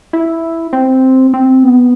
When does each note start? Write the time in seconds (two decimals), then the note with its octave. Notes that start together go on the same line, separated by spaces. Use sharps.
0.13 E4
0.73 C4
1.34 C4
1.63 B3